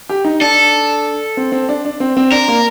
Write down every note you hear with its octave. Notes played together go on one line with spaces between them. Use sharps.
G4
D#4
D4 A4
C4
C4
D4
D4
C4
C4
D4 A#4
A#3